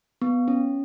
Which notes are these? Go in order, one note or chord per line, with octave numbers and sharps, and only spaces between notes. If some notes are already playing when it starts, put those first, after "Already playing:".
B3
C#4